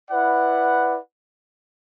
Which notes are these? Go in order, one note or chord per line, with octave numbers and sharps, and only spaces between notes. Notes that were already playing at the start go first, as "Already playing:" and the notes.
E4 B4 D5 F#5